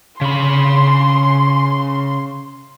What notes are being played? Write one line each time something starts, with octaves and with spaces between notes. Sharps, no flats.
C#3 B5 C6